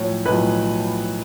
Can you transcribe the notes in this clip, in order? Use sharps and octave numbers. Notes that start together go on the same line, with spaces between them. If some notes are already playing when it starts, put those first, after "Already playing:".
Already playing: B1 A2 F3 C#5
B1 A2 F3 B4